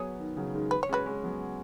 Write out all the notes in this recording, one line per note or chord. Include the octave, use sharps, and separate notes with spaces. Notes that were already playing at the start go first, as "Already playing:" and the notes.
Already playing: F#3 B3 G#4 C#5
D#3
C#3 F#3
D#3 G#3
B4
C#5
G#3 C#4
F#4 B4
G#3 C#4
F#3 B3